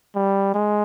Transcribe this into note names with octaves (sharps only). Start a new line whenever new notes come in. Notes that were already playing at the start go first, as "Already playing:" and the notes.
G3
G#3